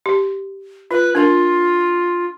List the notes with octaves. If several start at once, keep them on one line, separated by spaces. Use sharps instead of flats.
G4
F4 B4
D4 F4 A#4